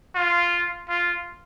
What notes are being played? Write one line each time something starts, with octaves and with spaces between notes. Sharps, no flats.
F4
F4